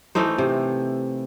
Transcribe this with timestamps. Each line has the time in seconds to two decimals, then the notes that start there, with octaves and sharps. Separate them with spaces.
0.15 E3 A3 D#4 C5
0.38 C3